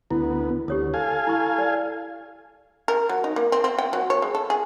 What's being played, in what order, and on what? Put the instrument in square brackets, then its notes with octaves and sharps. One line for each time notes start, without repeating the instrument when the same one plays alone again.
[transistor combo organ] D2 B3 [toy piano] E4
[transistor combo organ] D2 [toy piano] G4 C#5 D#6
[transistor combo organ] A4 F5 G#5
[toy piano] E4 C#6
D5
[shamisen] A#4
F#3
D#4
A#3
C4
C4
G5
F#3
C#5
G#3
A4
G#4